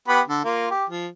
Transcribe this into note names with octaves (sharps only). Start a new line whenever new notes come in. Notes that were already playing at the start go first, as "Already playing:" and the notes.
B3 G4 B5
D3
A#3 F4
G4
F3